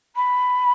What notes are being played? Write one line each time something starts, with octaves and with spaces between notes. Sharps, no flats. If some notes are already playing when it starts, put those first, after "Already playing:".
B5